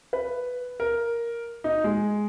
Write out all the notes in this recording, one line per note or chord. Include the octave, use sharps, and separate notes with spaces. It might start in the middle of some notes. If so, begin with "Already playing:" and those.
B4
A#4
D#4
G#3